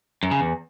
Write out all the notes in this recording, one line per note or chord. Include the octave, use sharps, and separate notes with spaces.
F#2
C#3
E2